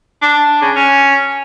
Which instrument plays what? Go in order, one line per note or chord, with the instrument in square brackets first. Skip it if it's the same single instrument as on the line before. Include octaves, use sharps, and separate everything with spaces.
[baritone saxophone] D4
C#3
C#4